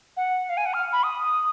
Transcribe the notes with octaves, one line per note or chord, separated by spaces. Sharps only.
F#5
F5
G#5
F#5
F6
B5
D#6